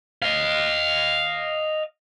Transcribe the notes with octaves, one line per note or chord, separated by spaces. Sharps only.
D#5 F5